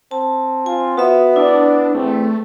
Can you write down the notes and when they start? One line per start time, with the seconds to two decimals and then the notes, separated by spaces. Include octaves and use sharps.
0.11 C4 A5
0.66 F4 G#5
0.97 B3 F#4 E5 D#6
1.36 D4 E4 D5
1.94 E2 A3 C4